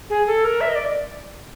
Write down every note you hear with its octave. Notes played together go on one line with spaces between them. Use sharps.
G#4
A4
A#4
E5
D#5
D5